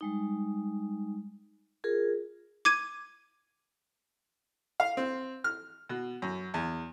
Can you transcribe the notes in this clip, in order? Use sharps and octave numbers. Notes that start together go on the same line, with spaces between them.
G3 G#3 D#4
F4 G#4 A#4
D6 G#6 D#7
F5
C4
F6
B2
F#2
E2